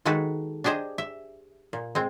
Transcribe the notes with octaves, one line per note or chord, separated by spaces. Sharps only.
D#3 G#3 D#4 F#4 A4 B4
D4 G4 G#4 C5 D#5
E5
A#2
G#3 C4